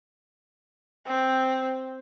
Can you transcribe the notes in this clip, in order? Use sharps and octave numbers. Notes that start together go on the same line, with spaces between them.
C4